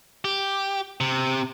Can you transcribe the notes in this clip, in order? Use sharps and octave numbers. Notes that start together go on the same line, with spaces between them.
G4
C3